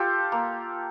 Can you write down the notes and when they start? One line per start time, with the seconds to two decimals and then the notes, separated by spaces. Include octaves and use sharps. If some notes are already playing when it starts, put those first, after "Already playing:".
Already playing: F4 G4 A4
0.32 A#3